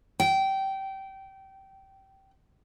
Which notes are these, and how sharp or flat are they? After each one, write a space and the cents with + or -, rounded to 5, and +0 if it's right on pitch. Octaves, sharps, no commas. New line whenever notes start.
G5 -20